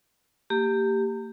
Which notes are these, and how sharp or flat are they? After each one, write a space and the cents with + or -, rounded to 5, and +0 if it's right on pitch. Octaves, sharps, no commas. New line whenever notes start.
A#3 -35 G4 +0